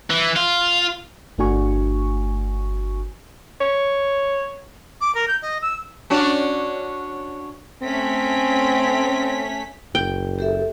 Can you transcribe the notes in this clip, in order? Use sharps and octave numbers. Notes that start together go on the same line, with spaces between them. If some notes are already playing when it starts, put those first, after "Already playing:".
E3
F4
G1 A3 D4 F#4 G#5 C#6
C#5
D6
A#4
G6
D#5
E6
C#4 D4 F#4
A3 C4 C#4 B6
F#1 G5
G4 A4 E5